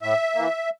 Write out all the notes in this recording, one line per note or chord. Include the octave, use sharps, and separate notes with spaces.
A2 E5
E3 A#3